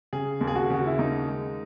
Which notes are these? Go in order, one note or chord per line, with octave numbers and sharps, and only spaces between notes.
C#3 G#4
D#2
G#4
F#4
C#3 F#4
E4
D#2 D#4
G#3